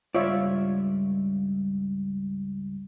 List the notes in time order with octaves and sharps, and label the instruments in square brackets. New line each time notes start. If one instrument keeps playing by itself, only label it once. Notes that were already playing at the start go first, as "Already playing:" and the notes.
[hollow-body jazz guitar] C#2 G2 D5 [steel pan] F4 C#5 E5